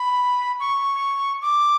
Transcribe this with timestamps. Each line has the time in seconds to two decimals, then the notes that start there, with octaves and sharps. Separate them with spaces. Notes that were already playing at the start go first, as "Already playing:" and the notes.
Already playing: B5
0.60 C#6
1.42 D6